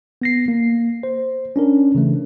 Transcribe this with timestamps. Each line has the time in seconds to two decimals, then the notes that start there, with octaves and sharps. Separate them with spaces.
0.22 B3 A#6 C7
0.48 A#3
1.03 C5
1.56 C#4 D4 A#4
1.95 C#3 E3 A3